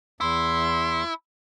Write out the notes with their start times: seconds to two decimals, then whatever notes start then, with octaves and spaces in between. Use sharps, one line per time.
0.21 E2 E4 C6